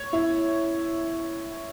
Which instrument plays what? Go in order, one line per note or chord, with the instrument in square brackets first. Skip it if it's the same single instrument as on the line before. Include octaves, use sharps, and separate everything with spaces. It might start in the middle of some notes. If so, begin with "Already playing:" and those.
Already playing: [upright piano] C#5
E4